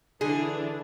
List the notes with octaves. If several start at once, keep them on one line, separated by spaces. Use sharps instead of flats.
D3 E3 D4 G#4